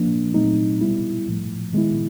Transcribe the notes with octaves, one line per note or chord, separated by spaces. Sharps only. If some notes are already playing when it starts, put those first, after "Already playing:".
Already playing: F3 A#3 D4
A#2 F#3 A3 C4 D#4
B2 G3 B3 E4
A2 F3 A3
D#3 G#3 B3 E4